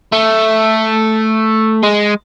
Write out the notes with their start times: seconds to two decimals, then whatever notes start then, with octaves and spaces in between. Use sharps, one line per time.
0.13 A3
1.83 G#3